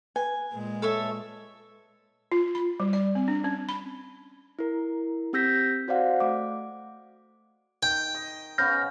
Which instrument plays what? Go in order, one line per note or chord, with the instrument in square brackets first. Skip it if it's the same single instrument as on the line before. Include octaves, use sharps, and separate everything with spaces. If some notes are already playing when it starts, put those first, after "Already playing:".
[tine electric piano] B4 [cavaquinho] G#5
[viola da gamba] A#2 G#3
[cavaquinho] A4 C#5 E5
[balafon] F4
B5
G3
D5
C4
D4
C#4
B5
[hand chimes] E4 A#4
C4 G4 E6 G6 A#6 B6
F#4 C5 D5 F5 F#5
A3 D6
[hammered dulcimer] D#3 [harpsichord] G5
[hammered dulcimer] D#5
[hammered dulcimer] C#3 B3 C#4 [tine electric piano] F6 G6 A#6